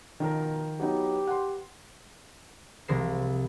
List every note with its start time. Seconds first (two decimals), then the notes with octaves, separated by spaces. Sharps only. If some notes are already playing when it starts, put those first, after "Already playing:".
0.20 B2 D#3 F3 A#4
0.80 F#3 B3 D#4 G4 B4
1.27 F#5 C6
2.88 C2 F3 G#3 A#6 C7 E7